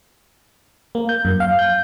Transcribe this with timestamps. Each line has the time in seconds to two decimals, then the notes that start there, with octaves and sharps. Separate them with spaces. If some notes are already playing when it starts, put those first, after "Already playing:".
0.95 A#3
1.09 G6
1.25 F#2
1.40 F5
1.59 G6